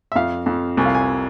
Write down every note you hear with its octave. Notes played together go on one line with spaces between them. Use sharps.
E5
F2 F5
F2
C2 G#5
F5
G#5